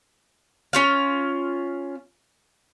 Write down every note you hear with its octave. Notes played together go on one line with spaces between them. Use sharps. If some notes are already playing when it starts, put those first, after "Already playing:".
C#4 F4 F5